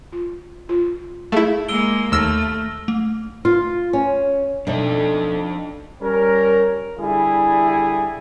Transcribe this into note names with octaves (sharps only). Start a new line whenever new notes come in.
F4
F4
A3 E4 G#4 F5
G#3 A#3 E6 D7 G7
D#2 A3 E6 F6 A#6
A3
F4
C#4
F2 B2 A3 D4 D#4 A4 D#5
G3 C#4 A#4
D3 G3 E4 G#4